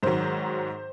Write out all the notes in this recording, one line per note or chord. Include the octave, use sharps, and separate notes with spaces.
G#2 D#3 F#3 C5